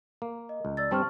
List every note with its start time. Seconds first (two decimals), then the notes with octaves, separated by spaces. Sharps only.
0.22 A#3
0.49 D#5
0.65 C#2
0.77 D5 E6 A6
0.91 G2 G3 C4 A5 C#6 F6